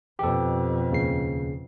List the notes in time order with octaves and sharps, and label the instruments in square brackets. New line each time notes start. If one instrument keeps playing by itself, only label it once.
[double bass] F2 B2 [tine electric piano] G4 A4
[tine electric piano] D#2 C#3 C7